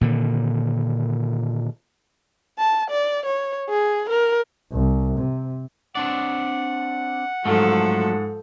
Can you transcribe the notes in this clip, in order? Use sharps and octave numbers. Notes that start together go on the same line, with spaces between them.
A#2 D3 D#3
A5
D5
C#5
G#4
A#4
C2
C3
C4 D4 D5 F#5
G#2 F3 F#3 A3 A4